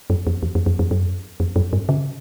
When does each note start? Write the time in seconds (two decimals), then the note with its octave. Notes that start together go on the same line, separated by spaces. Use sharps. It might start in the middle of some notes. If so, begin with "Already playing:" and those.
0.10 F#2
0.27 F2
0.43 E2
0.55 F2
0.66 F2
0.79 F2
0.91 F#2
1.40 F2
1.56 F#2
1.73 G2
1.89 C#3